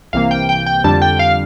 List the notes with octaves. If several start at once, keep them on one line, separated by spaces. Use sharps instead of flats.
C2 C3 E3 A#3 F5
G5
G5
G5
F2 D3 G3 D4 A5
G5
F5